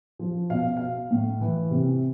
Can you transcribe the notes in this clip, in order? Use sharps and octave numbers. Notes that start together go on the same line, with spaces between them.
F3
B2 F5
F5
A2
E3
C3